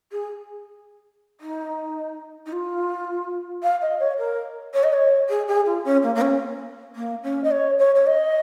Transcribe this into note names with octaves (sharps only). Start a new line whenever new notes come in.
G#4
D#4
D#4
F4
F5
D#5
C#5
A#4
C#5
D#5
C#5
G#4
G#4
F4
C#4
A#3
A#3
C#4
A#3
C#4
D#5
C#5
C#5
C#5
D#5